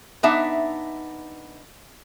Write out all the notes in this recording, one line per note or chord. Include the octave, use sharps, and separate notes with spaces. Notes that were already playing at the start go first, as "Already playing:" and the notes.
B3 D4 D#4 E5 A5